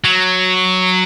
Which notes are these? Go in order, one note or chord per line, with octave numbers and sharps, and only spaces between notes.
F#3